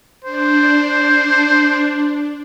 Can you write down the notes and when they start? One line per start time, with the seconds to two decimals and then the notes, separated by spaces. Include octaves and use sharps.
0.24 D4 C5